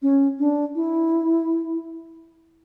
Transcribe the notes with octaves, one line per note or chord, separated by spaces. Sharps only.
C#4
D4
E4